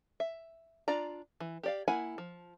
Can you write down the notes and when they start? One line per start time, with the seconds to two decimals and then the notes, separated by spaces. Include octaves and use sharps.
0.20 E5
0.88 D4 F4 D5 A#5
1.40 E3
1.63 G4 D5 F5
1.88 A#3 E4 F#5 G#5 B5
2.18 F3